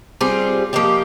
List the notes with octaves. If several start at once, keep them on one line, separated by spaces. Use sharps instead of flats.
G3 C4 F4 G#4
F3 A#3 D#4 G4